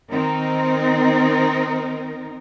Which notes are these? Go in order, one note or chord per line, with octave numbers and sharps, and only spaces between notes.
D#3 C4 D#4 A#4